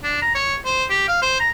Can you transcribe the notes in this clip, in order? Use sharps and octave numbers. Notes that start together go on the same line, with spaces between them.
D4
A#5
C#5
C5
G4
F5
C5
A#5